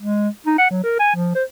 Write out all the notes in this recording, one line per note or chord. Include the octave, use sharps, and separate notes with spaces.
G#3
D#4
F#5
F#3
A#4
G#5
F3
C5